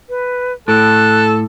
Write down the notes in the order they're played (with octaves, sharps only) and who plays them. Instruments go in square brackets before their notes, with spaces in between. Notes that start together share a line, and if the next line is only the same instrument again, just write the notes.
[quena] B4
[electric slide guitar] A2 [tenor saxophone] A4 [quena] F#6